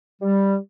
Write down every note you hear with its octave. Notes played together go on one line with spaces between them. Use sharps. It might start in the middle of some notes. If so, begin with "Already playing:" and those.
G3